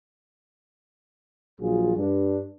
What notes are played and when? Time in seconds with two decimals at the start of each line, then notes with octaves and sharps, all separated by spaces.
1.60 A#1 F#3 F4 G#4
1.96 G2 D4